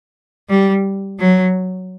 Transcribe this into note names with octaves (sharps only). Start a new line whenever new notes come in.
G3
F#3